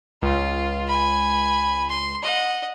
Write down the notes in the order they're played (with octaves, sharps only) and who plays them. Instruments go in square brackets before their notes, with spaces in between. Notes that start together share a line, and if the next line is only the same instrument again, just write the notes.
[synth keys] C#2 [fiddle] F4
[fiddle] G#5 B5
C6
D#5 F#5